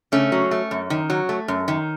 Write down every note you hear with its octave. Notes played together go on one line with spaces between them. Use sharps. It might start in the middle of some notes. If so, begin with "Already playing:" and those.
C#3 A3 C#4
F#3
A3
F#2
D#3
F#3
A3
F#2
D#3